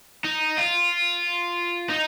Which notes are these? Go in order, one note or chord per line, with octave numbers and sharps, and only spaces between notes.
D#4
F4
D#4